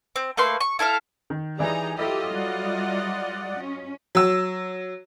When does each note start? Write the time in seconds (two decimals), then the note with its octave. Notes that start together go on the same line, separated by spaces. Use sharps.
0.16 C4
0.37 A3 A#3 B4 C6
0.61 C#6
0.79 E4 A4 E5 F5
1.30 D#3
1.59 E3 G3 D#4 G#4 D5 A#5
1.98 F#3 E4 F4 G4 A4 D#5 E6
2.34 G3 D5 F#5
3.59 C#4
4.15 F#3 E6